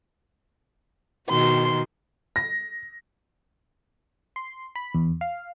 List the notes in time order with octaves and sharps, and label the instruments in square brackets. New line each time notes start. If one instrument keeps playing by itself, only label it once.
[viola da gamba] B2 D#3 F#4 [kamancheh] C6
[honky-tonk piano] A#6
[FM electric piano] C6
B5
E2
F5